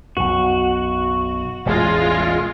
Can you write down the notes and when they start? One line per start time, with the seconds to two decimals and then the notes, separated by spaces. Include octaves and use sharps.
0.17 B1 F#2 F#4
1.66 E1 A1 G#3 F4